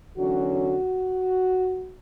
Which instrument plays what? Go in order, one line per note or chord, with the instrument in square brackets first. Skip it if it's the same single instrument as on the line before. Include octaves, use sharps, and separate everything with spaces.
[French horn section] E2 D3 F#3 C#4 F#4